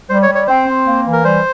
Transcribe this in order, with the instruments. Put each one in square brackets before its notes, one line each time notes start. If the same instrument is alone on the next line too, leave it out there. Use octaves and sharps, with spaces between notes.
[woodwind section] G3 [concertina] C5
[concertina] C#5
[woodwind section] G3
[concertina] C#5
[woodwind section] C4 [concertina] C5
[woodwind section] C4
A#3
E3
[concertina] A#4
[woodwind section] G3 [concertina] C5